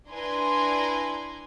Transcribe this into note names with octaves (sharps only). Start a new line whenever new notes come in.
D4 E4 B4 G#5 A#5 C6